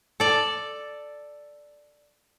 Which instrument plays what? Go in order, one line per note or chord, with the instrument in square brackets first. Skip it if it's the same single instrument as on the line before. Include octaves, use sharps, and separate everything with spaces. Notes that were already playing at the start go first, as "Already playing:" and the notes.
[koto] A4 D5